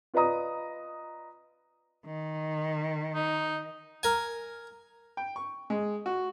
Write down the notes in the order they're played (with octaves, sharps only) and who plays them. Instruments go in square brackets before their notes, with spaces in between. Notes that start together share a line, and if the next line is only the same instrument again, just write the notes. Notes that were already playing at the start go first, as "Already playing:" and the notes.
[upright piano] F4 B4 D5 D#5 A#5 D#6
[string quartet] D#3
[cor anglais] D#4
[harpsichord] A#4 G#5
[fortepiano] G5
C#6
G#3
F#4